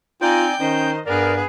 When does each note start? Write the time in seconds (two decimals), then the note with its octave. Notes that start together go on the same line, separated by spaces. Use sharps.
0.22 C4 D#4 F4 D5 G5 G#5 G6
0.60 D#3 C#4 D#4 C5 D#5
1.06 G2 B3 G#4 A#4 D5